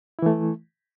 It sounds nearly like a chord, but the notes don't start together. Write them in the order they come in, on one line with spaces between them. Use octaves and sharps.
E4 E3 A3